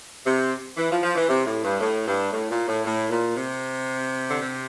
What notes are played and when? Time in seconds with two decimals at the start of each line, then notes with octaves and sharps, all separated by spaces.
0.25 C3
0.77 E3
0.91 F3
1.02 F3
1.15 E3
1.28 C3
1.46 A2
1.64 G2
1.80 A2
2.06 G2
2.32 A2
2.50 A#2
2.67 A2
2.84 A2
3.09 A#2
3.36 C3
4.29 D3
4.40 C3